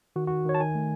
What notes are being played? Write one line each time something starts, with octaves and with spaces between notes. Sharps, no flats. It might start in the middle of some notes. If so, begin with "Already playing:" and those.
D#3 F#4
D#3 F#4
D#3 C#5
A5
D#3 G#5
A3